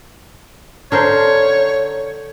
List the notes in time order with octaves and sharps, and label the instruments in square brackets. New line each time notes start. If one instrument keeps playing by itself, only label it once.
[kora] D3 A#4 C5 [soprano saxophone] C#5